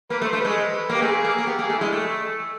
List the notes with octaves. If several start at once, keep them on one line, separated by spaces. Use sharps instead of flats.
A#3 B4
A3
C5
A3
G#3 B4
A#3
G4
A3 G#4
A#3
A#3
B3 G4
A#3
G#4
A3
G#3 E4
A3